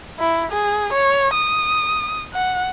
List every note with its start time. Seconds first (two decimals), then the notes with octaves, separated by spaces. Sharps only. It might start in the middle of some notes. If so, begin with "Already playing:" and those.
0.20 E4
0.52 G#4
0.93 C#5
1.33 D#6
2.34 F#5